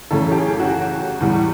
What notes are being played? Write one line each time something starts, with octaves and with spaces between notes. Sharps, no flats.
F#2 C#3 E3 A3 C#4 A4
G4
G#4
F#4
G4
E2 B2 G3